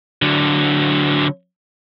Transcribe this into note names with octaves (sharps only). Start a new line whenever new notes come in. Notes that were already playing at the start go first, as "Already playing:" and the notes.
D3 F#3